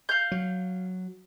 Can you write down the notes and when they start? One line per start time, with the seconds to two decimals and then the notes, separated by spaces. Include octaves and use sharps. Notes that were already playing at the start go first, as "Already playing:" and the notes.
0.09 F5 G6
0.31 F#3